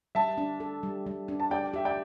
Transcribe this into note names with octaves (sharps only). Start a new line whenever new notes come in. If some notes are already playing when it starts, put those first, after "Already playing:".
G3 E5 A5
D4
A4
G3
G3
D4
A5
G4 D5 G5
G4 E5
D5 G5